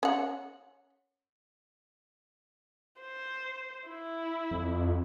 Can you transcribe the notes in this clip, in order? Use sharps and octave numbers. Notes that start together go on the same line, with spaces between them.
C#4 F#5
C5
E4
F2